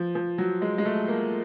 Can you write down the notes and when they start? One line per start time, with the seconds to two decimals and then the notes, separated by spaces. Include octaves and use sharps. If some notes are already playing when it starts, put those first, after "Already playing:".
Already playing: F3
0.15 F3
0.38 F#3
0.62 G#3
0.78 G#3
0.85 A3
1.08 A#3